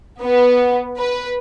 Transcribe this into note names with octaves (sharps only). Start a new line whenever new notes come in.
B3
B4